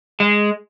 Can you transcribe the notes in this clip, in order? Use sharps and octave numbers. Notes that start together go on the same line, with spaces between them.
G#3